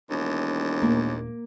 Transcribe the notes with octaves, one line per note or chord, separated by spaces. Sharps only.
E1 D#2
D#1 A3 A#3